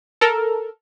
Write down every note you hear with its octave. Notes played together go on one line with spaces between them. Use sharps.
A4 A#4